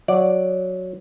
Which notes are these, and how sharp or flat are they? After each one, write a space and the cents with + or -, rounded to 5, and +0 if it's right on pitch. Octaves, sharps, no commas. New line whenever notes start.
F#3 -5 D5 +0